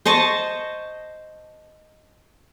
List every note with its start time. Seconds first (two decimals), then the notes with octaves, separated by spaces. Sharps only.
0.05 C5 D#5 A5 C#6